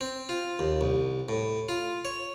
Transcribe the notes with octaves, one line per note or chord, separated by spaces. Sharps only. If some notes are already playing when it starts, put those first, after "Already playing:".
C4
F4
D#2
C2
A2
F4
C#5